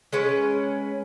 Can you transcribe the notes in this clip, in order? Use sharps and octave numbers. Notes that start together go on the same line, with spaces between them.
G#3 C#4 B4